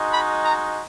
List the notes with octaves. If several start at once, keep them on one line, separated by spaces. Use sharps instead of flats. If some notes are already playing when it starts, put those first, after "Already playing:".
Already playing: G#3 D#4 F#4
B5
A#5